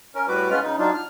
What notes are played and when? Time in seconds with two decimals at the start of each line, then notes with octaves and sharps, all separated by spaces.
0.15 C#4 A#4
0.28 A2 G3 F#4 B4 D6
0.50 G#3 B3 C#4 F4 B4 F6
0.63 C#3 D#4
0.79 F#3 D4 D#4 F4
0.94 F6